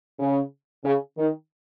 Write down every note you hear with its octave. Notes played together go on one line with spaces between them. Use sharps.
C#3
C#3
D#3